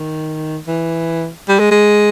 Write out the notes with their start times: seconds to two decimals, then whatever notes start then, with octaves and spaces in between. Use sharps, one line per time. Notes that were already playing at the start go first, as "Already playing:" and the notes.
Already playing: D#3
0.68 E3
1.48 G3
1.60 G#3
1.71 G#3